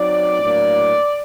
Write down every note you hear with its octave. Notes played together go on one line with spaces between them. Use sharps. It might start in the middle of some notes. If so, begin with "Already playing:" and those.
Already playing: F#3 C4 D#4 D5
A2 F#3 A#3 D4